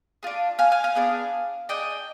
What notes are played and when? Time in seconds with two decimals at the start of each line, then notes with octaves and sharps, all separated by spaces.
0.23 D4 F4 G#4
0.59 F5 G#5
0.72 F5 G#5
0.84 F5 G#5
0.95 B3 D4 G#4
1.69 D4 G#4 D#5 G5